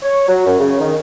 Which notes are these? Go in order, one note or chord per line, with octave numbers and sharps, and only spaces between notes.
C#5
F#3
F#2
C#3
D#3